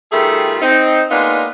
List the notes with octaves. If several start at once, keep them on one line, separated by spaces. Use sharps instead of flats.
D#3 G3 A3 F4 G#4 A4
C4 D#4
G#3 A#3 B3 D4 D#4 F4